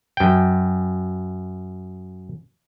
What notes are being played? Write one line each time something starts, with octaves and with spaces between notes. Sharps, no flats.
F#2 G5